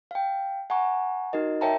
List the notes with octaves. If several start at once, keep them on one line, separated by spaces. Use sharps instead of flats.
F5 G5
F#5 G#5 A#5 C#6
D#4 F#4 A#4 D#5
A#4 C#5 E5 G5 A5 A#5